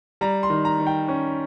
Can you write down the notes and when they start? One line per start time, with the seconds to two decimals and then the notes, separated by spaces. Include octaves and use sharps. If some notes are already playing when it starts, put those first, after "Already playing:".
0.21 G3 A#5
0.43 C6
0.50 D#3
0.65 A#5
0.79 D#3
0.87 G5
1.08 C#4